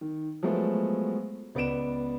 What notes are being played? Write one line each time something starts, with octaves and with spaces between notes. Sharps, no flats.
D#3
F3 F#3 G#3 A3 B3
C#2 B3 D5 D7 E7